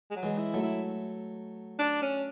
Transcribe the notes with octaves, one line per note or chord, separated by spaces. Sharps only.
G#3
F#3
E3 G#3
E4
F#3 A3
E4
D4
C#4